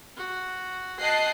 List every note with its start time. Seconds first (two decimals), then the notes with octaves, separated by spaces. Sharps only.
0.17 F#4
0.99 D#5 G5 A5 F#6 C7